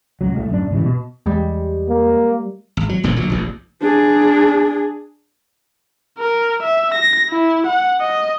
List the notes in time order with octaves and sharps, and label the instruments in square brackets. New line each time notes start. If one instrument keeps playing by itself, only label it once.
[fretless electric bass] D1 C#2 F#3
C2 A3
D1 F#2 D4
G#2 C#3 E3 G3
B2
[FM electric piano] E2 [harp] G3 G#3
[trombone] A#3
[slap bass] G#1
F#3
F1 A#2 D3 F3
A#1 D3 F#3
F1 A#1 D#2
[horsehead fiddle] D4 G#4
[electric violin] A#4
E5
A#6
E4
F#5
D#5